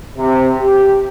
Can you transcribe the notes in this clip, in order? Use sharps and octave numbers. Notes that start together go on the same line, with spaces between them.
C3
G4